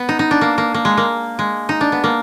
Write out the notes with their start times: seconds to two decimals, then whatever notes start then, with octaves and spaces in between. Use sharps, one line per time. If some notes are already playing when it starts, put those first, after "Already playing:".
Already playing: B3
0.09 D#4
0.19 D#4
0.31 D4
0.41 A#3
0.58 A#3
0.74 A#3
0.85 G#3
0.97 A#3
1.39 G#3
1.69 D#4
1.81 D4
1.92 B3
2.04 A#3